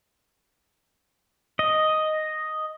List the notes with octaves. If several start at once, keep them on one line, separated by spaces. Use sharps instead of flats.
D#5